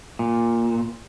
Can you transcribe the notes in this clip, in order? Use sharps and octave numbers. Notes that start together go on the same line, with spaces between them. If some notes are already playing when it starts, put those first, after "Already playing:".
A#2